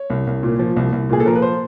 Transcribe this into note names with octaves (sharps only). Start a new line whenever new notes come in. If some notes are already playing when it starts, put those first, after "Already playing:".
Already playing: C#5
C2
C2
A#2
F3
C2
C2
A#2 G#4
A4
F3 A#4
B4
C5